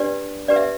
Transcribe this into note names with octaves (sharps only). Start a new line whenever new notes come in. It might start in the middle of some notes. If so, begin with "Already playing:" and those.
Already playing: D4 G4 B4 D5
D4 G4 B4 D5
E5